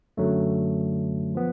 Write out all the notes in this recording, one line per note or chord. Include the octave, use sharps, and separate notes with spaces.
F#2 D3 F#3 A3
F3 B3